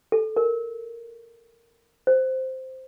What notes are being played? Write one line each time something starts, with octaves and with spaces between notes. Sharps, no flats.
A4
A#4
C5